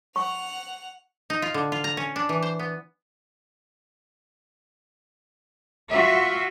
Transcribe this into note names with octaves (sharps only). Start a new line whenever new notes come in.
F#5 C#6 F7
D#4
F4
D3
F4
A#5
C#4
D4
E3
C5
B3
F4 F#4 E5